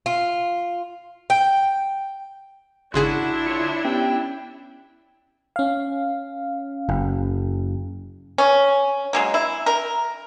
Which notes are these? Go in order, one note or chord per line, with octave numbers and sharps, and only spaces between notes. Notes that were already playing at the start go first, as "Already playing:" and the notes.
F4
G5
G#1 C#3 D4 E4 F#4 G#4 C6 F#6
F4 C#5 C#7
B3 C#4 G4 G5
C#4 F5
F#1
C#4
F#3 G#3 A#3
E4
A#4